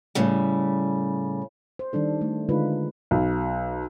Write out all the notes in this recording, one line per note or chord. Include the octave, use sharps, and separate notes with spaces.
A2 C#3 G3
C5
D#3 G3 D4 A4
A3
D3 G#3 D#4 F4 B4
B1